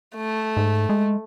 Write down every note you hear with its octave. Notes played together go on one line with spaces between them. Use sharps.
A3
G#2
G#3